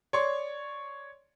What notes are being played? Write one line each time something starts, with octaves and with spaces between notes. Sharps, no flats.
C#5 D5 C6 C#6